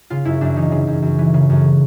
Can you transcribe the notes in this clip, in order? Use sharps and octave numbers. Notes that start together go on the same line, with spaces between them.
C#3 F4
F#2 E4
F#2 D4
E3 D#4
C#3
F#2
F#2
E3
C#3
F#2